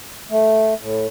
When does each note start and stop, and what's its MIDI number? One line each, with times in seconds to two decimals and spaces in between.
0.30 0.74 57
0.81 1.07 45